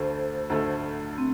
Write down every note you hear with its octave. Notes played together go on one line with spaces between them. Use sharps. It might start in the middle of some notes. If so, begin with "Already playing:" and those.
Already playing: D2 D3 A3 C5
D2 D3 A3
C4